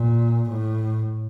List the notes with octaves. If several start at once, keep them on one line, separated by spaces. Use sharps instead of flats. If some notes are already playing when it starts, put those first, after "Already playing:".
Already playing: A#2
A2